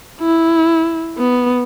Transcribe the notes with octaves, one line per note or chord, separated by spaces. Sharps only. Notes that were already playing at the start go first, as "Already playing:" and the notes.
E4
B3